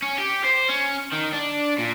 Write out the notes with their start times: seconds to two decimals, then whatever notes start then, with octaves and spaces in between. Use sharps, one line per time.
0.02 C#4
0.18 G4
0.44 C5
0.69 C#4
1.13 D#3
1.33 D4
1.78 A#2